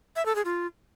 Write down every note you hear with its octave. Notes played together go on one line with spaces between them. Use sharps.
E5
A4
G#4
F4